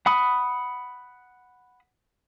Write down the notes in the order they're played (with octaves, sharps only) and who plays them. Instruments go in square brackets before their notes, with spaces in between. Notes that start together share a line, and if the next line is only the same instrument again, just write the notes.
[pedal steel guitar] F#5 B5 D#6